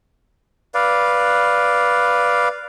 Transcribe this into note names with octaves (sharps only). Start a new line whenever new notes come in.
B4 D5 F5